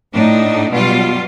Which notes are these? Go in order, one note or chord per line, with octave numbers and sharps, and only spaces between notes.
A2 D4 D#4
B2 F#3 G3 F4